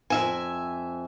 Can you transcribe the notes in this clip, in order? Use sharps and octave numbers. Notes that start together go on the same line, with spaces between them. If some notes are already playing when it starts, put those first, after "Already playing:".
F2 E5 G#5